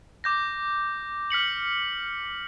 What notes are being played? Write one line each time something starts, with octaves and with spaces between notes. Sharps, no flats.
D6 G6 A#6
F6 B6 C#7 F#7